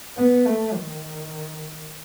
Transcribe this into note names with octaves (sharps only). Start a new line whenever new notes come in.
B3
A3
D#3